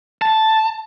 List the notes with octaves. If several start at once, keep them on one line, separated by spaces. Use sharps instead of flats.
A5